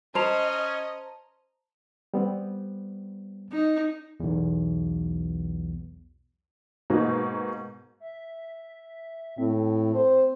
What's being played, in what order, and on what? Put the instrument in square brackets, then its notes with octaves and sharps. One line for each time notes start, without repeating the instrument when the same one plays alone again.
[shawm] C#4 [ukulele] C5 [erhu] D#5 [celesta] A5 A#5 F7
[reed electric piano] G3 B3 C4
[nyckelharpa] D#4
[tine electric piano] B1 E2
[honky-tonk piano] G#2 B2 A#3 D#4
[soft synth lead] E5
[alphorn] A2 [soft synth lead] C4
[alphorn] C5